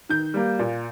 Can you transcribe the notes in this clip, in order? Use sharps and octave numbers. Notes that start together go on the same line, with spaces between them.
D#3 G6
G3 A#3
A#2